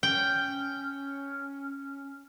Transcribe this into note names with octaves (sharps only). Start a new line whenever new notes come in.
C#4 G5